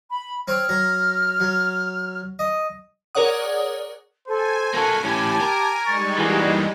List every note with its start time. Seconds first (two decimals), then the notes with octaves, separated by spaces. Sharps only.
0.10 B5
0.48 C4 C#5 F6
0.69 F#3 A#5
1.40 F#3
2.39 D#5
3.15 G#4 A#4 C#5 D5 F#5 D#6
4.28 A4 C5 G#5
4.74 A#3 F#4 A4
5.04 A2 C#4 G4 A5
5.41 A#4
5.86 G3 G#3 D#4 C#6 A6
6.19 E3 A#3 F#4 G#4